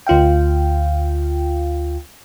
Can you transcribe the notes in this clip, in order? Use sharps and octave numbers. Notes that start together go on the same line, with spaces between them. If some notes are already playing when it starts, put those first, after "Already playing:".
D2 F4 F5 G5